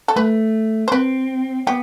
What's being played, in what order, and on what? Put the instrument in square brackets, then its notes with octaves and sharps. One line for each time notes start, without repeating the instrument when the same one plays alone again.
[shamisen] A4
[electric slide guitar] A3 [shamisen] B4
[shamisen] C5
[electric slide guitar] C4 [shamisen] B4
[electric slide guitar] B3 [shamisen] G4